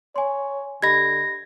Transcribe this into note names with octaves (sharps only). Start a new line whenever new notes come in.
C#5 G#5 C6
D3 G4 D#5 B5 G#6 A#6